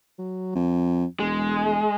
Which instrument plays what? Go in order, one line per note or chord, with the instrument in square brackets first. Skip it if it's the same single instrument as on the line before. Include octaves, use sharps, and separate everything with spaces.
[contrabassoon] F#3
F2
[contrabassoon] E1 [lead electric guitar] G#3